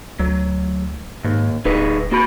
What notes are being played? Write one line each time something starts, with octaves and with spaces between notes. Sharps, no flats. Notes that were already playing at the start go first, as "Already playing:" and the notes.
D2 F#3
D#2 G#2
D1 D#4 G#4 B4
A#3 F#4 B5